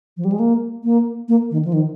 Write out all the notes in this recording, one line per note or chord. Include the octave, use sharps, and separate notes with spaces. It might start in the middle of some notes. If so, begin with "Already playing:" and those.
F3
G3
G#3
A#3
A#3
A#3
D#3
F3
D#3